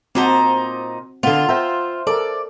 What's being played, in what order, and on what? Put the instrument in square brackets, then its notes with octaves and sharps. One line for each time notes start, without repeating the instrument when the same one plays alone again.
[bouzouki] A#2 D#4 C5 [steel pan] C4 F#4 A5
[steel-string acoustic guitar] D3 B3 [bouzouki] F4
[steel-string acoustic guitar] C5 E5 [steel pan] G5 A#5
[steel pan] A4 A#4 A5 [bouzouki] D5